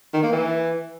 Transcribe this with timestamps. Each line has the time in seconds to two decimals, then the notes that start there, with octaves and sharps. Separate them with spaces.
0.14 D#3
0.23 A#3
0.32 E3